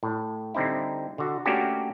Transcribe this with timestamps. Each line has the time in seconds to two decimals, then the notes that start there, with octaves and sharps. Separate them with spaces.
0.03 A2
0.55 D3 G3 C4 D#4 E4
1.18 D3 F#4
1.46 A3 A#3 C#4 D4 F#4 G4